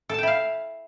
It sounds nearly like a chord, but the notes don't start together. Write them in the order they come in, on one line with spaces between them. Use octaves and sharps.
A4 A5 G5 E4 F5